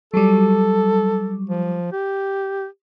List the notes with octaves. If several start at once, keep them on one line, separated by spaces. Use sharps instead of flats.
F#3 G3 A4
F3
G4